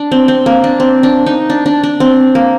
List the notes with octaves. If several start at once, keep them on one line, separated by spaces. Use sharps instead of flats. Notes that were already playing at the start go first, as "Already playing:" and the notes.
Already playing: D4
C4
C4
A#3
D4
C4
D4
D#4
D4
D4
D4
C4
A#3